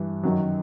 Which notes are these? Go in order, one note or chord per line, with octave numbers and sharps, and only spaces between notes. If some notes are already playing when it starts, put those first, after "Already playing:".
Already playing: G2 E3
F#2 D#3 F#3